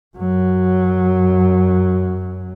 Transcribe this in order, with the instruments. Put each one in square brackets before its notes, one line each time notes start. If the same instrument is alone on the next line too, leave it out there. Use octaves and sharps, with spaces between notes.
[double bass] F#2 F#3